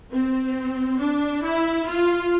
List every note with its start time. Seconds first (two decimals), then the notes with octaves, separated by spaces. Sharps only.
0.12 C4
0.99 D4
1.43 E4
1.86 F4